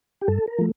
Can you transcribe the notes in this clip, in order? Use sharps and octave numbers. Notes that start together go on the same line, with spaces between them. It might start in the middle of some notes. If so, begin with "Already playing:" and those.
G4
G2 A4
A#4
F3 A3